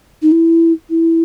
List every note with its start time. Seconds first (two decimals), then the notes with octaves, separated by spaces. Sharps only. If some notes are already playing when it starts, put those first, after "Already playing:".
0.22 D#4
0.32 E4
0.90 E4